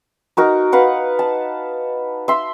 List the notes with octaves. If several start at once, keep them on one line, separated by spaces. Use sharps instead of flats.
D#4 F#4 A#4
B4 F5 F#5
A5
E5 C6